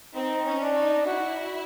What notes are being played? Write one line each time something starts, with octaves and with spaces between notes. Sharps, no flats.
C4 D#4
C#4
D4
D#4
E4 F#4